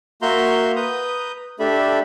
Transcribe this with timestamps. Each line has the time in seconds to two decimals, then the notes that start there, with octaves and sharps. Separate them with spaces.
0.22 A#3 F#4 E5 A#5 C6 G6
0.76 B4 A#5 D#6 G6
1.59 A3 D4 G4 A4 E5 B5